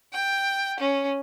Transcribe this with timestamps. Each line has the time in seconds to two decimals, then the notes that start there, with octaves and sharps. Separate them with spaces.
0.13 G5
0.79 C#4